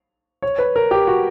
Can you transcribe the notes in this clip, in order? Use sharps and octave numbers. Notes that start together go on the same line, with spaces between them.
C#5
B4
A#4
G4
F#4